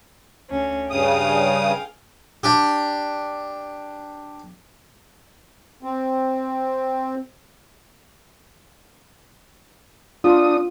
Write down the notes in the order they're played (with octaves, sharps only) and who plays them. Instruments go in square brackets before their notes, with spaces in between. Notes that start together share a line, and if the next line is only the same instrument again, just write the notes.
[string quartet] D2 C#4
[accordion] G2 C#3 D#6 [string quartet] G#4 F5 G5
[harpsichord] D4 G4
[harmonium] C4
[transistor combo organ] D4 D#6 [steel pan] F4